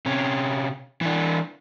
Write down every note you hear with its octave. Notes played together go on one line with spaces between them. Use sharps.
C3 C#4
E3 D4